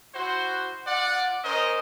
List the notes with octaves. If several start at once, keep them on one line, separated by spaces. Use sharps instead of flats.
E4 F#4 C5
F4 D5 F#5
C#4 A#4 C5 D#5